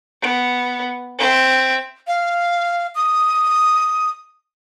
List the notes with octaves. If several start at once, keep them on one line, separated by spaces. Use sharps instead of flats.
B3
C4 E5
F5
D#6